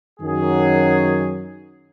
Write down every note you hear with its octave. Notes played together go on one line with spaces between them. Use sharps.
F#2 D#3 F#3 G#4